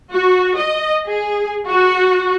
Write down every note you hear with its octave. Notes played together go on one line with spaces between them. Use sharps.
F#4
D#5
G#4
F#4